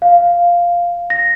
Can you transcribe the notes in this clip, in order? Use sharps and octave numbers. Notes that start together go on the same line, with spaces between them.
F5
A#6